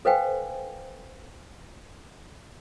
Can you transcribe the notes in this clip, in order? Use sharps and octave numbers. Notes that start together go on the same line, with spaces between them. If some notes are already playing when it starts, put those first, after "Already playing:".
A4 B4 C5 F5 G5 G#5